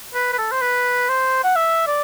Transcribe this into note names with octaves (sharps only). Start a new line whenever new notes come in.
B4
B4
A4
C5
B4
C5
F#5
E5
D5